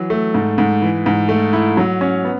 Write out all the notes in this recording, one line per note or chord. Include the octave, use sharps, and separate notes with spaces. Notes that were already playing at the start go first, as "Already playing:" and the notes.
Already playing: E3 F#3
A3
G#2
G#2
E3
G#2
A3
E4
F#3
C#4
B3